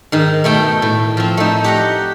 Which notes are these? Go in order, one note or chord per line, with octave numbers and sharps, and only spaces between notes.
G#2 D#3
B2 A3 G5
A2
F3 C4
A3 D#4
G4 F#5 A#5